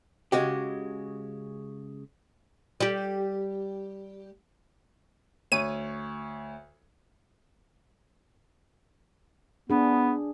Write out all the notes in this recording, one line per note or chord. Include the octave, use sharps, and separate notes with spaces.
C#3 G#3 F#4 G4
G3 G4
D2 C#5 D#7
B3 D4 G#4